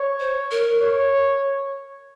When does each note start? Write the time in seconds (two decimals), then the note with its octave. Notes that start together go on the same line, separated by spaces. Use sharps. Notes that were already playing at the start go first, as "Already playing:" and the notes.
Already playing: C#5
0.20 C5
0.51 A#4
0.81 C#5